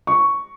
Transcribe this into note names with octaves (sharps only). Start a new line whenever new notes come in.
C#6